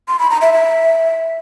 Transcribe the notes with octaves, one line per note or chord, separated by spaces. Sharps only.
C6
B5
A#5
E5
E5